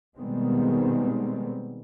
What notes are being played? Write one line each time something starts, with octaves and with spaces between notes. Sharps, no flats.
B2 D#3 G3 G#3 B3 C4